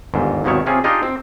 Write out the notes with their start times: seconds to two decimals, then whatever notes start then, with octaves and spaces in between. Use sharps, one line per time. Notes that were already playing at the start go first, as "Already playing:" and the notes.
0.14 G1 D#2 G#2
0.44 G#1 D#2 B2 D#3 E4 C#5
0.66 C3 C4 C#4 F4 G#4
0.84 D4 D#4 F4 G4 G#4 D#5
1.03 C4